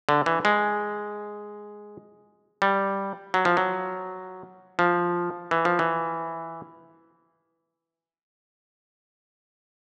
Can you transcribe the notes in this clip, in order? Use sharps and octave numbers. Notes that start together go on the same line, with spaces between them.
D3
E3
G#3
G3
F#3
F3
F#3
F3
E3
F3
E3